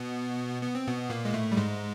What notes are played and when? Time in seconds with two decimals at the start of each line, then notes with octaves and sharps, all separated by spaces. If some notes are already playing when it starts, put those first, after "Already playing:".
Already playing: B2 B3
0.62 B3
0.75 C4
0.87 B2 B3
1.10 A#2 A#3
1.25 G#3
1.33 A2 A3
1.52 G3
1.57 G#2 G#3